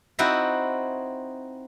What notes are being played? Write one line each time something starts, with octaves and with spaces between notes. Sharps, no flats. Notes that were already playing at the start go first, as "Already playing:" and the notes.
C4 D#4 E4 F#4 C5 E5